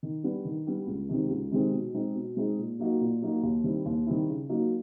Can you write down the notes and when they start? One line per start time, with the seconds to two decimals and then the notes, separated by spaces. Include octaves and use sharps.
0.03 D#3
0.23 G3 B3 D4
0.45 D#3
0.67 G3 B3 D4
0.87 C#2
1.09 C3 D#3 G#3 C4
1.30 C#2
1.51 C3 D#3 G#3 C4
1.72 B2
1.94 G#3 C4 D#4 G#4
2.15 B2
2.37 G#3 C4 D#4 G#4
2.58 A#2
2.79 F#3 A#3 D#4 F#4
3.00 A#2
3.22 F#3 A#3 D#4 F#4
3.43 D#2
3.64 D#3 G3 C4 E4
3.85 D#2
4.07 D#3 G3 C4 E4
4.29 C#3
4.49 F#3 A#3 D#4